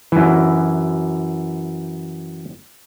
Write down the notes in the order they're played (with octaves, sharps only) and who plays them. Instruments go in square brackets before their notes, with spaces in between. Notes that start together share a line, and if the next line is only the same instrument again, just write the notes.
[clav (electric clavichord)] F#2 E3